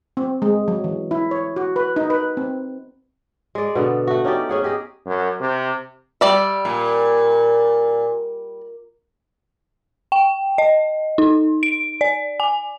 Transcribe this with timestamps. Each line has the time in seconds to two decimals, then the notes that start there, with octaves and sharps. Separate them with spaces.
0.17 C4
0.42 G#3
0.68 F#3
0.84 E3
1.11 E4
1.31 C#5
1.56 F#4
1.76 B4
1.96 D#4
2.10 B4
2.37 C4
3.55 G#3 D5
3.75 B2 D3 B3
4.07 A3 F#4
4.24 C#4 D#4 G4 D5
4.49 C#4 G#4 F#5
4.64 G4 G#4 D#5
5.06 F#2
5.40 C3
6.21 G3 D5 E5
6.65 A#2
10.12 G5
10.58 D#5
11.18 D#4
11.63 D7
12.01 D5
12.40 G#5